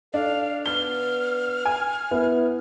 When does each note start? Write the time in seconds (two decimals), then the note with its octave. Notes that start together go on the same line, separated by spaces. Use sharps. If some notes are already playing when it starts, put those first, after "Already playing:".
0.14 D4 A4 F5
0.66 B3 F6 G7
1.65 G#5
2.11 B3 E4